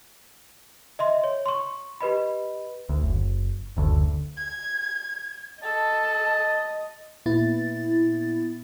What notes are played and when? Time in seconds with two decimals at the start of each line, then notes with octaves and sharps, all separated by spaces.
0.99 D#5 E5 C6
1.24 C#5
1.46 C6 C#6
2.00 G4 B4 D#5 B5
2.89 D2
3.02 F#1
3.77 F#1 D2 D3
4.37 G#6
5.63 A4 D#5 A5
7.26 A#2 B3 E4 A6